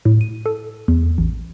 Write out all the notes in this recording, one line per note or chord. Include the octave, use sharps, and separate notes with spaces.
A2
D#7
A4
E2
A1